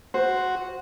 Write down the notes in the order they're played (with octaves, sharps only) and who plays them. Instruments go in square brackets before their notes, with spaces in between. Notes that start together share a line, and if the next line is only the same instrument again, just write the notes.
[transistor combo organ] F#4 [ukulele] C5